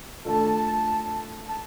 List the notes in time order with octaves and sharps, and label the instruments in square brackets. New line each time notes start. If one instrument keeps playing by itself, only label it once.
[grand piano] A3 D4 F4 A4 [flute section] A5
[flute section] A5